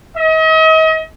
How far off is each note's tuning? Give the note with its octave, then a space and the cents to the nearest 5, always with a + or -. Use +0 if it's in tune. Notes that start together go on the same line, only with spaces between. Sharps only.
D#5 +40